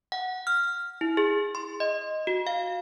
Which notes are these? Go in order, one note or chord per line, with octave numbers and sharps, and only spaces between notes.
F#5
F6
E4
G#4
C6
D#5
F#4
F5